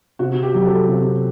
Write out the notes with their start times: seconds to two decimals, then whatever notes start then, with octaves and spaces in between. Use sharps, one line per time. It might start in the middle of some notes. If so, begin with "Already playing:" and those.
0.19 C3 F#4
0.43 G4
0.54 F#3
0.66 A4
0.89 C3